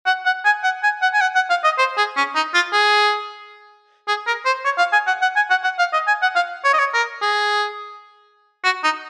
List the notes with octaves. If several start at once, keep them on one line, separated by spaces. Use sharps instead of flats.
F#5
F#5
G#5
F#5
G#5
F#5
G#5
F#5
F#5
F5
D#5
C5
G#4
C#4
D#4
F4
G#4
G#4
A#4
C5
C#5
F5
G#5
F#5
F#5
G#5
F#5
F#5
F5
D#5
G#5
F#5
F5
C#5
D#5
C#5
A#4
G#4
F#4
D#4